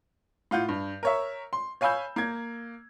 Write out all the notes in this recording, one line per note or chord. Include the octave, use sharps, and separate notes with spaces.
A2 F4 F#5 G6
G2
A#4 C#5 E5
C6
C#5 F5 G#5 B5 E6 G6
A#3 G#6